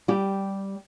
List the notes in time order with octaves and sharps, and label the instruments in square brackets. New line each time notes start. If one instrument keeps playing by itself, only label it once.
[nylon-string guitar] G3 G4